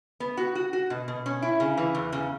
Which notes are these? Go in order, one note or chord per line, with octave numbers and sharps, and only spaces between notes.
B3
F#4
F#4
F#4
B2
B2
C#4
E4
C#3
E3
E2
C#3